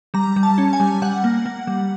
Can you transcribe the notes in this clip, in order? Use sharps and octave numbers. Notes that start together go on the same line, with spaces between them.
G3 A#5
G3
A5
C#4
G#5
G3
G3 F#5
A#3
A#3
G3